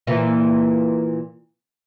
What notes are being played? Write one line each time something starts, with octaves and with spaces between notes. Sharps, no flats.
A#2 E3